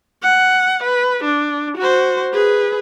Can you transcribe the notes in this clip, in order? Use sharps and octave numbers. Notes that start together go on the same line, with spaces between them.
F#5
B4
D4
F#4 C5
G#4 B4